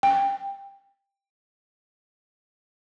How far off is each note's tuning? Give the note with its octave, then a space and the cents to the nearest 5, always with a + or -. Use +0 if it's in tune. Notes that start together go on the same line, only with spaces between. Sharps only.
G5 +15